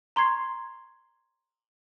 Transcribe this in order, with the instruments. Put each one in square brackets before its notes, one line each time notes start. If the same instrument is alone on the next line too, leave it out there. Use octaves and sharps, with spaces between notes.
[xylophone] A#5 C6 C#6 G#6 C7